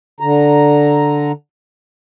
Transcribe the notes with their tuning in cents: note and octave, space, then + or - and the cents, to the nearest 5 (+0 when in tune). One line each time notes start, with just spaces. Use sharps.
D3 +0 A#5 +0